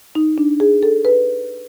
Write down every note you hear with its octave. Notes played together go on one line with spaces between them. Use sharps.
D#4
D4
G#4
A4
B4